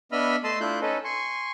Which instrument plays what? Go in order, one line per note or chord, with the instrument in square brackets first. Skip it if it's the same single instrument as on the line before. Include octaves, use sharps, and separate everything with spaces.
[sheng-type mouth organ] B3 D4 D#5 E5 B5 F6
A3 D#5 A5 C6 E6
A3 D4 E4 F4 F#6 G6
C#4 D#4 A4 B4 D#5
G#5 C6 C#6